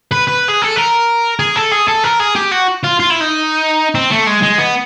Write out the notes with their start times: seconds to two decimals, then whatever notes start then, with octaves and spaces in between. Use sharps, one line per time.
0.12 B4
0.28 B4
0.49 G#4
0.62 A4
0.76 A#4
1.40 G#4
1.56 A4
1.72 G#4
1.88 A4
2.04 A#4
2.19 G#4
2.35 G4
2.51 F#4
2.83 F4
2.99 F4
3.10 E4
3.20 D#4
3.95 C4
4.11 A3
4.27 G#3
4.43 G#3
4.59 B3